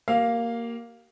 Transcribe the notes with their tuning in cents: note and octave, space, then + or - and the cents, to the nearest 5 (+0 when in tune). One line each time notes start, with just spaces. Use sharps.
A#3 +0 G4 -35 F5 +0